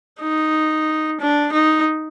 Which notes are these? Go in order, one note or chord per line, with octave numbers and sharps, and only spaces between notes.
D#4
D4
D#4